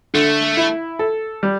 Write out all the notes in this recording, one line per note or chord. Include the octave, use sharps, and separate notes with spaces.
D3 A3
E4
A4
G3